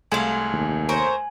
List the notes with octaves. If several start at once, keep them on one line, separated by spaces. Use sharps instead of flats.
C2 G#3 A3 F5 G#5 G#6 E7 F#7
D#2
A#4 C5 C#5 G#5